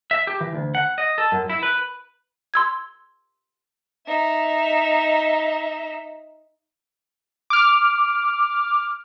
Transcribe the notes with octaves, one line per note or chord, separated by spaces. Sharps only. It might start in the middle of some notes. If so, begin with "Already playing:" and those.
E5
G4
E3
D2
F#5
D#5
A4
F#2
E4
B4
C6 E6 G#6
D#4 E5
D6 F6